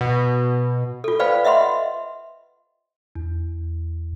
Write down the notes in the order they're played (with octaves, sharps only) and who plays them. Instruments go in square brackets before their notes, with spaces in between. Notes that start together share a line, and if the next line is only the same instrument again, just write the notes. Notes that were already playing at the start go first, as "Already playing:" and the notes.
[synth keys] B2
[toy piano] F4 A4
B4 C5 D5 F5 G5 B5
D#5 E5 F#5 B5 C6
[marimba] E2